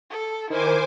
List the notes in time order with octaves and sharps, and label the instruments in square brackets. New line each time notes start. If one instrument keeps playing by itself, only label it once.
[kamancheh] A4
[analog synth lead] D#3 [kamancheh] E4 [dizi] A#4 [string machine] C5 G#5 D6